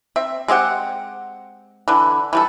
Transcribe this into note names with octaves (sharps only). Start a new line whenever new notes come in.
C4 E5
G#3 C4 G4 F#5
D3 E3
E3 G3 A4